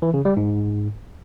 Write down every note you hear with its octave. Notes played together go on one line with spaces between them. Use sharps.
E3
C#3
G3
G#2